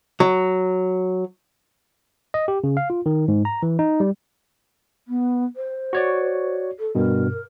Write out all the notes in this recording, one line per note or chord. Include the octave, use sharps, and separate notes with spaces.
F#3
D#5
G4
C#3
F5
F4
D#3
G#2
A#5
E3
D#4
G3
B3
C5
F#4 C#5 D5
A4
G2 B2 A#4